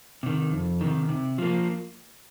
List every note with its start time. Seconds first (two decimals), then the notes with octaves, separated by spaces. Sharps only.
0.23 C3 D#3
0.52 F2
0.81 C3 D#3
1.09 C3
1.38 F3 A#3